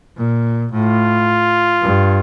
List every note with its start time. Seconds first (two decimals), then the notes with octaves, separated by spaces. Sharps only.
0.17 A#2
0.72 A2 F4
1.83 G2